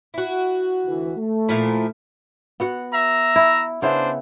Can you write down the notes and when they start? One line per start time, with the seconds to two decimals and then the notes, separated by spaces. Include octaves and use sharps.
0.14 E4 F#4
0.86 D2 E3
1.16 A3
1.49 A#2 F3 E4
2.60 B3 F#4 F#5
2.94 E5 A#5
3.36 E4
3.82 C#3 B3 D4 E4 C5